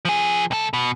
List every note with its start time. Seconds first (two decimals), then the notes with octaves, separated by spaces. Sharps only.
0.05 F3 G#4
0.51 C2 A4
0.73 B2